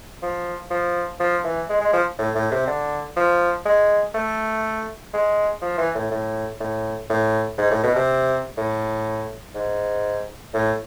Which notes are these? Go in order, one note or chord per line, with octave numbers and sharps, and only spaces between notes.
F3
F3
F3
E3
G#3
G#3
F3
A2
A2
C3
D3
F3
G#3
A3
G#3
F3
E3
A2
A2
A2
A2
G#2
A2
B2
C3
A2
G#2
A2